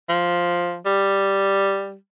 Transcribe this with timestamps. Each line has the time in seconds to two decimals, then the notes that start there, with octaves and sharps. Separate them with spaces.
0.09 F3
0.86 G3